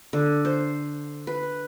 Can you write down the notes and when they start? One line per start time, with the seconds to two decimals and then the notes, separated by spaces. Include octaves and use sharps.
0.13 D3
0.45 C5
1.27 B4